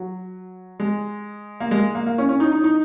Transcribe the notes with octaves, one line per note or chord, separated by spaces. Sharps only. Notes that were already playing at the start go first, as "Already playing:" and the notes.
Already playing: F#3
G#3
A#3
G#3
A#3
A#3
C#4
C#4
D#4
D#4
D#4